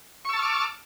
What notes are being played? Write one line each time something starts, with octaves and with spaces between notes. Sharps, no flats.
A5 C#6 D6 E6 F6